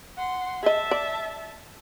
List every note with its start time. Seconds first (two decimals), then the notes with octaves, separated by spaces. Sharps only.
0.17 F#5 C6
0.63 G#4 D#5 E5 A5
0.91 D5